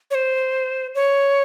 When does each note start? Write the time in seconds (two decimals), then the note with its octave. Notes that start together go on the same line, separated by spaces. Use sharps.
0.11 C#5
0.15 C5
0.95 C#5